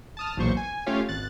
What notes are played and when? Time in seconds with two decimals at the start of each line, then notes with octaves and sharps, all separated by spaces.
0.17 A5 D#6 F6
0.37 B1 E2 A#2 C5 C#6
0.57 G#5
0.86 A3 C#4 F4 G4 C#5 F5
1.08 G#1 F#6 A6